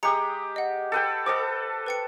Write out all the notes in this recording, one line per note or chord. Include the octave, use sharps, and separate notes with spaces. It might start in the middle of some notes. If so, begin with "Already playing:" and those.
G#3 G4 A#5 D#6 C#7
D#5 F#5
A4 B4 G5
A4 C5 D#5 D6
B4 G5 C#7